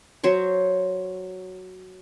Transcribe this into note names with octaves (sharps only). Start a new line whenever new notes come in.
F#3 C5 C#5